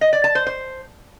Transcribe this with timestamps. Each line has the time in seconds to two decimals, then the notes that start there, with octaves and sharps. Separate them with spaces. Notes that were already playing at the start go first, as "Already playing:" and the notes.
0.01 D#5
0.13 D5
0.24 A5
0.35 C5
0.47 C5